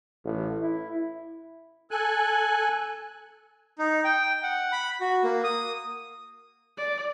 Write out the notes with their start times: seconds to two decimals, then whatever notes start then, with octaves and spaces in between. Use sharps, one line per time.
0.24 A1
0.62 E4
1.91 A4 G#5 F#6
3.78 D#4
4.05 G5
4.43 F#5
4.72 B5
5.01 F#4
5.23 A#3
5.44 D#6
6.78 D5